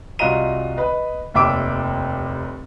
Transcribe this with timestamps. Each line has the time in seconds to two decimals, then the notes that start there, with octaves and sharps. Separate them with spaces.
0.19 C2 F4 F#4 D#5 A#5 D#7
0.77 B4 D#5
1.34 F1 D#2 E5 D6 D7